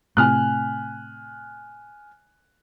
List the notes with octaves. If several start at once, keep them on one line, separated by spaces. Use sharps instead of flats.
A2 C3 G#5 F6 F#6